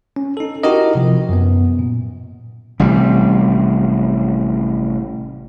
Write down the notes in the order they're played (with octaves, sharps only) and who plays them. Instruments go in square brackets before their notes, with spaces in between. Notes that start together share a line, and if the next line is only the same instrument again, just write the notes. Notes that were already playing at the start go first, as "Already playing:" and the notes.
[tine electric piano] C#4
D#4 A4
D#4 E4 F#4 G4 A#4 D#5
C3 F3
F#2 B3
A#2
[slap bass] A1 C3 G3